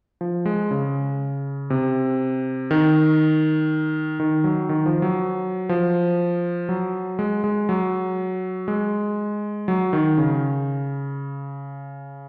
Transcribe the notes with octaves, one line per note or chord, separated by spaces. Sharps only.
F3
G#3
C#3
C3
D#3
D#3
F#3
D#3
F3
F#3
F3
F#3
G#3
G#3
F#3
G#3
F#3
D#3
C#3